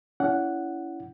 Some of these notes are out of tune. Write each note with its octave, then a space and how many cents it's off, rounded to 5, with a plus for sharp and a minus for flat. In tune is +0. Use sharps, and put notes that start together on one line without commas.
C#4 +35 E4 +20 F#5 +0